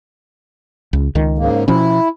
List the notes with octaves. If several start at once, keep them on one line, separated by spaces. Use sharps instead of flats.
C#2
C#2 D#3
G#2 C#3 A#3
B2 F3 C#4 E4